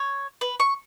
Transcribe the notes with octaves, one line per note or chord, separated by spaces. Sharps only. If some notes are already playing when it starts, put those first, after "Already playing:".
Already playing: C#5
B4
C#6